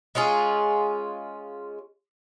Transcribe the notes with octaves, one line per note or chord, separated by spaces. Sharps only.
G#3 C#4 F4 G#4